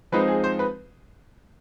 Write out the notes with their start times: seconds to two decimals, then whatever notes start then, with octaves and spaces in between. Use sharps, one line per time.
0.12 F3 G#3 C4 D#4 B4
0.28 G#4
0.44 C5
0.59 B4